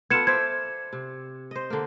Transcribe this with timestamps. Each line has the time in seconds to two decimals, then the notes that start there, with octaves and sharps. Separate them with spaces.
0.10 B3 F4 A4 G#6 C#7 E7
0.27 C5 D5 E5 G#6
0.93 C3
1.51 C5 D#5
1.70 D3 A#3